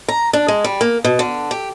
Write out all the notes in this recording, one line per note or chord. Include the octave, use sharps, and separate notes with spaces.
A#5
D4
G#3
G3
A#3
B2
D3
G4